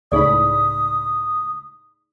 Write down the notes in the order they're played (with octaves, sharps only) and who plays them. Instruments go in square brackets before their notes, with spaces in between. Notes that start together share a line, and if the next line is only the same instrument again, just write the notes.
[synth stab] C#2 A2 B5 [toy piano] D#4 G#4 D5 [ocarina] D#6